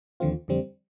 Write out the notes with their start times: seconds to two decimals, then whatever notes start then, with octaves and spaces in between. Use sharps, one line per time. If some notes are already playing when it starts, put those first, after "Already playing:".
0.20 D#2 D3 F3 C4 F4
0.48 F2 D3 G3 C4